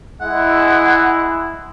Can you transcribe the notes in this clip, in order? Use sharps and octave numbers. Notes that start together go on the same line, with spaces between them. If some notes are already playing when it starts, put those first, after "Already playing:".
G#3 E4 F#5